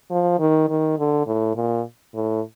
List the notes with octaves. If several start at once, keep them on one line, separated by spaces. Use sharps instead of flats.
F3
D#3
D#3
D3
A2
A#2
A2